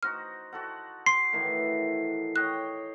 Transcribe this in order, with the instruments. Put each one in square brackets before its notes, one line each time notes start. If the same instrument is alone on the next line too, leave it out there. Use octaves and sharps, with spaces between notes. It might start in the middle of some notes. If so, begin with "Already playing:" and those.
[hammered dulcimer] D#4 F#4 C5 [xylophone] F6
[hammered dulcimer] F#4 A4 F#5
[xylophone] C6 [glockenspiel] C7
[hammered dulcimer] A2 D#3 E3
[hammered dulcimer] C#5 D#5 G5 [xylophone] F#6